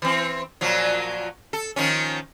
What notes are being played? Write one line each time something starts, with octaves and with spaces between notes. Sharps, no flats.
E3 C4
A#2 F3 F#3
A4
D#3 F3 C#4